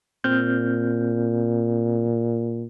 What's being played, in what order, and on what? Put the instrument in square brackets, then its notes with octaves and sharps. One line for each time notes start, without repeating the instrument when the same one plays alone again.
[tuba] A#2 [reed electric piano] C4 F6 G6